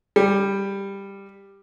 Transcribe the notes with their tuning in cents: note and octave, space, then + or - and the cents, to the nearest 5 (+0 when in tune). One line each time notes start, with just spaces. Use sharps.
G3 +10